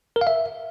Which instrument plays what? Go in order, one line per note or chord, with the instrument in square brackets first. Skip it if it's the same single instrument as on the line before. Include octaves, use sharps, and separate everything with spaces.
[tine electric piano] A#4
F5
E5